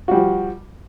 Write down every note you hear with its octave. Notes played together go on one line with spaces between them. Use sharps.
F3 G3 F#4